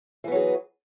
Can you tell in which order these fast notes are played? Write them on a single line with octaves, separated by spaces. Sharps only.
E3 B3 F#3 G#4